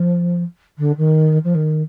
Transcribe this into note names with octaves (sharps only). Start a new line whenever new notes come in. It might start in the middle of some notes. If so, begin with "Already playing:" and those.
Already playing: F3
D3
D#3
F3
D#3